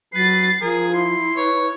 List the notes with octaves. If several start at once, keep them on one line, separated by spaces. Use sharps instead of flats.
F#3 B4 A6 C7
F3 G#4 A#4
E4 C6
B4 C#5